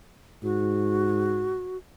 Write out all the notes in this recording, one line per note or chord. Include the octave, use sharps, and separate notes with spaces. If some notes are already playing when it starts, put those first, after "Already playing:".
G#2 F#4